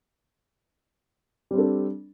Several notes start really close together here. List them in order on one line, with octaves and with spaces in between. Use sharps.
G3 C4 D4 A4